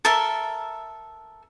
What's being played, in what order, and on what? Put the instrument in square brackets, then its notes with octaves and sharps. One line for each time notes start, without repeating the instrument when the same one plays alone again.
[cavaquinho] A4 A#4 E5